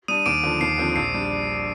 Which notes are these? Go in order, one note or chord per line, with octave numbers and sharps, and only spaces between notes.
G3 D4 D#6 D#7
D#2 D6 D7
D3 F3
D#2 C7
D3 F3 C4
A#1 C7
G3 D4